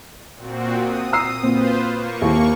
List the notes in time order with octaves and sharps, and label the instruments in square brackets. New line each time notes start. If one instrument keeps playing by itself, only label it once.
[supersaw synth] A#2 C4 F#4
D#6
[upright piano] A#5 E6 C7 [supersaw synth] D#6
[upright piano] A#2 C4 [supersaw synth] F4 B4 C5
[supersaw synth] A#3 C#6
[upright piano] D#2 E4